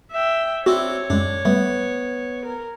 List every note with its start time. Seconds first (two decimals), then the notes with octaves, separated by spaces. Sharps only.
0.12 E5 G5
0.66 C4 D4 E4 F#4 C#5
1.10 F#2 G#3 D4
1.45 G3 A3 B3
2.45 A#4